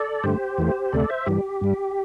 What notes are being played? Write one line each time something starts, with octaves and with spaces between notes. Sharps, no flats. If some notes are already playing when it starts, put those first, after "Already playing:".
Already playing: A4 D5
G2 D3 A3 G4 C5
E2 E3 A3
D2 C3 A3 A4 D5
C5 E5
G2 E3 G3 G4
G2 G3